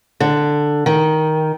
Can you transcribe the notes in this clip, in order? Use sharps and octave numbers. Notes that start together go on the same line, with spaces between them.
D3
D#3